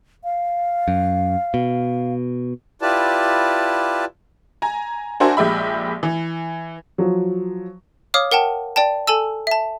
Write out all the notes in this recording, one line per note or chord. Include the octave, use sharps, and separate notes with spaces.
F5
F#2
B2
E4 F4 G4 B4 D5 A5
G#5 A#5
D4 F#4 A#4 C5 E5 G#5
A#1 G#3 G4 E5 B5
E3
F3 F#3
C#5 F5 D6 D#6 F6
A#4 F#5 G5 A5
D5 G5 A5
A4 G#5 A5 E6
E5 A5